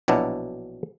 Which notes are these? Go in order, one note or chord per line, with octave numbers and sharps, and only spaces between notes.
A#1 B2 F#3 D4 E4